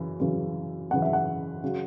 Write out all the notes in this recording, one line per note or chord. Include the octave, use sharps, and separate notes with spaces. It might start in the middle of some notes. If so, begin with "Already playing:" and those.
Already playing: F#2 C#3 E3
F#2 C#3 E3
F#2 C#3 E3 F#5
E5
F#5
C#3 F#3